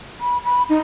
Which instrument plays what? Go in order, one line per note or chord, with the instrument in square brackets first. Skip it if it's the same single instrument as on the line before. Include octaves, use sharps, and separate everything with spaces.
[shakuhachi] B5
B5
D#4